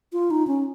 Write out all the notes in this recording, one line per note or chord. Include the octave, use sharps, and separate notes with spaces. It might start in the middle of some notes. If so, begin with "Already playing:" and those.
F4
D#4
C#4